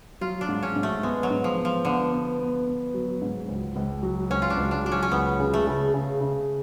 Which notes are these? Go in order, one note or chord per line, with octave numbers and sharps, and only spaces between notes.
F#3 F4
D4
G#2
C#4
G#2
A3
G#3 B3
F#3
G#2
F3
B3
F3
D3 B3
B3
B3
B3
F#3
G#2
C#2
C#2
F#3
C#2 C#4
F4
D4
C#2
D4
F#3 D4
C#4
C#4
C#2 B3
C#3
A3
C#3
C#3
C#3